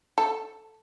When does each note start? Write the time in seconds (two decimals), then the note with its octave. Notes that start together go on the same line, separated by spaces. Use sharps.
0.18 A4